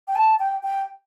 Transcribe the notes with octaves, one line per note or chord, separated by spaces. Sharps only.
G5
A5
G5
G5